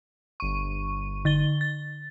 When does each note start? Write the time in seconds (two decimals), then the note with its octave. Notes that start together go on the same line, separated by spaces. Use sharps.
0.40 G1 C#6 D#7
1.25 D3 A6 G7
1.61 A6